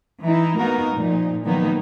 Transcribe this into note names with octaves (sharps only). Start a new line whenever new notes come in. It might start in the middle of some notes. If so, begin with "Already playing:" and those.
E3 D#4 E4
A#3 B3 D#4 F#4 A#4
A#2 F3 D#4
D#3 F3 F#3 A#3 B3 D#4